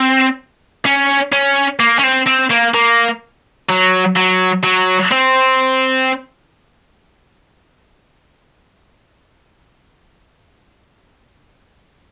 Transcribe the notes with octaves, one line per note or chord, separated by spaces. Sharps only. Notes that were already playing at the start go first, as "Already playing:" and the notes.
Already playing: C4
C#4
C#4
A#3
C#4
C4
C4
A#3
A#3
F#3
F#3
F#3
C4